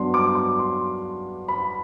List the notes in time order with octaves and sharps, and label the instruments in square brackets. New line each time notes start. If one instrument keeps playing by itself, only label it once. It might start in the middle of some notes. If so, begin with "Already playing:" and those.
Already playing: [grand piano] G2 F#3 B3 D4 C6
D6
D6
C6
B5